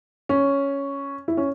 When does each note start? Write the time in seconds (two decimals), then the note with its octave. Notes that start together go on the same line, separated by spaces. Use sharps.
0.29 C#4
1.28 E4
1.37 C#4